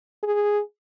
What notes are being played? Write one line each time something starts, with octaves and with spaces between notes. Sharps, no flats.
G#4